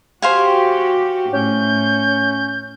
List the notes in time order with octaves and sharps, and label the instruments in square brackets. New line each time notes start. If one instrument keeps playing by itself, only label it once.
[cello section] F#4 G4 [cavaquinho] C5 F5 G#5
[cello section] A2 [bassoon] C#4 [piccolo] G6